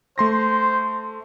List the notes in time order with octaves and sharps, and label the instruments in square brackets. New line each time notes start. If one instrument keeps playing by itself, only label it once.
[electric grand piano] A3 C6 A#6 [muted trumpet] C5